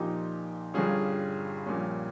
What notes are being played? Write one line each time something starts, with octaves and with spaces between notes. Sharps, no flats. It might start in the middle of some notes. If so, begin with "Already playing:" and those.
Already playing: A#1 A#2 F3 D#4 G4
G1 G2 G3 C#4 F4 G#4
A#1 A#2 G3 C#4